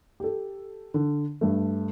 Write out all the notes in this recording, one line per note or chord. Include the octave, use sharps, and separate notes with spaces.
G4 A4
D3
G2 A3